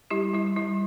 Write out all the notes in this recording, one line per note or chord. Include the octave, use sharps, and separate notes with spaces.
G3 E4 G4
G3 E4
G3 E4